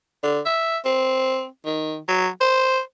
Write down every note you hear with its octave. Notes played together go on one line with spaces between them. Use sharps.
D3
E5
C4
D#3
F#3
C5